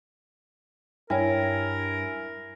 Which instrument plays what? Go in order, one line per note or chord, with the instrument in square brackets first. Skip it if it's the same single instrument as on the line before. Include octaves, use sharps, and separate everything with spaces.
[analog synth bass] G2 [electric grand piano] E4 G#5 [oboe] A#4 [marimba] C#5 G5